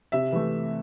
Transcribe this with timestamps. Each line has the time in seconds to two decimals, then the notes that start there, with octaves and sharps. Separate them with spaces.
0.12 C3 E5
0.32 E3 A3